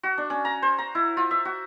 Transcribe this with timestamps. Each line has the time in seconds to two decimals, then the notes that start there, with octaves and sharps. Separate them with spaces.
0.03 F#4
0.18 D4
0.30 C#4
0.45 A#5
0.62 C5
0.78 A#5
0.95 E4
1.17 F4
1.31 E5
1.45 F#4